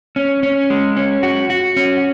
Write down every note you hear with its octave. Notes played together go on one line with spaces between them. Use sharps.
C#4
C#4
G#3
C#4
F#4
F#4
C#4